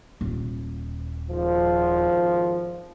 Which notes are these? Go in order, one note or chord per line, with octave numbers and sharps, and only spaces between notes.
D#1
G#1 F3